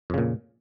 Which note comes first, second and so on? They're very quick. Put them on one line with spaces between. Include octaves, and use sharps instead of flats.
F2 C#3 A#2